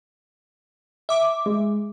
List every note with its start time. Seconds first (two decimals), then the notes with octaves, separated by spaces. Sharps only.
1.09 E5 D6
1.46 G#3